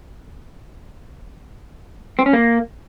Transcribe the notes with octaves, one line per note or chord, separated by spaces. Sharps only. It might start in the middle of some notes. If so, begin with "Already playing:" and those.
C4
C#4
A#3